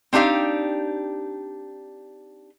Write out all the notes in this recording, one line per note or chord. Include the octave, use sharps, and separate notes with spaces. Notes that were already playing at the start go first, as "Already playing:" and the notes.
C4 D4 D#4 G4 F5